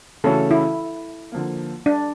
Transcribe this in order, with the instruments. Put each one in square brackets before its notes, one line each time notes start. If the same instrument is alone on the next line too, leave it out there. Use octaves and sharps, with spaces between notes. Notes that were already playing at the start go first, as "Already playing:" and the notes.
[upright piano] C#3 E3 A3 C#4 F#4 [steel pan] A4
[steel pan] E4
[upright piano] D3 F3 A#3
[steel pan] D4